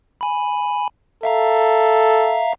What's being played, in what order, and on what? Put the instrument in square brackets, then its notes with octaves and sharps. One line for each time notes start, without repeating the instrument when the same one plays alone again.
[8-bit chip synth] G#5 B5
[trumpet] A4 [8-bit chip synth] E5 F5 A#5